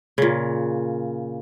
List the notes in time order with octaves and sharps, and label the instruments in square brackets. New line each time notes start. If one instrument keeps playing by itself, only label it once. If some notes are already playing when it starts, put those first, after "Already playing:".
[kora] A#2 C#3